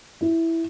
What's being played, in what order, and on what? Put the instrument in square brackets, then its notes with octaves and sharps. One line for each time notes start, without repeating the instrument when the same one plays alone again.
[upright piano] E4